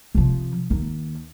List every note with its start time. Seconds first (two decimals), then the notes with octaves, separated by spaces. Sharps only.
0.15 C3 F3
0.70 D#2